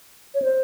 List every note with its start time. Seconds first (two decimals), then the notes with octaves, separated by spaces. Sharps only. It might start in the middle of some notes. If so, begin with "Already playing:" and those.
0.34 C#5
0.42 C5